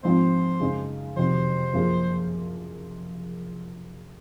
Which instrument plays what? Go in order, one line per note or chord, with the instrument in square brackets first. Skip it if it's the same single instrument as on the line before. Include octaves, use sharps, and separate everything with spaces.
[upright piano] G#2 F3 C4 F4 [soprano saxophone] C5
[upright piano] F#2 C#3 G#3 D#4
[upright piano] F2 C3 D#3 F#3 [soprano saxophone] C5
[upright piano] F#2 F3 A#3 F4 G#4